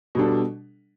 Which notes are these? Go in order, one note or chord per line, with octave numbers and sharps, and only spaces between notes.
B2 G3 D4 A4